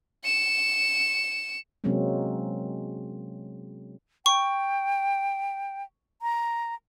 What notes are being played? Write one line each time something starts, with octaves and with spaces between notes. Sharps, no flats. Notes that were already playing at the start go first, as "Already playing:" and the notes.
C#7 E7
C3 F#3 G#3 A#3 C4 C#4
G5 C#6
A#5